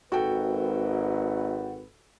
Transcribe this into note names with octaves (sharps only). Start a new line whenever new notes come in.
G#1 F#4 A4 B4 G5